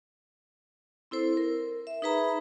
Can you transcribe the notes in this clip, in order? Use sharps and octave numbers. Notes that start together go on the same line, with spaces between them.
C4 E4 A4 C5
A#4
E5
D#4 G#4 B4 E5 A#5 B5